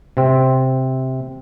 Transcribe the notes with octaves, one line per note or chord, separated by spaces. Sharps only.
C3 C4